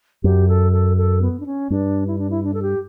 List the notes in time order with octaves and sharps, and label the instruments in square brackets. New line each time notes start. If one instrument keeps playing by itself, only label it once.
[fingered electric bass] F#2 [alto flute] G4
[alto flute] A4
A4
A4
B3
D4
C#4
[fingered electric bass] G2 [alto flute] D4
[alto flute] E4
D4
E4
D4
A4
G4